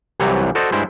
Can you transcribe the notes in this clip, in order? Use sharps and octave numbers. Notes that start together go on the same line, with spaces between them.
C2 C3 E3 F#3 G3 C#5
F#4 A4 C5 D5 D#5
G2 G#3 E4 C5